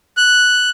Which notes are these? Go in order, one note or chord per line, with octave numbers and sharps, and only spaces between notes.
F#6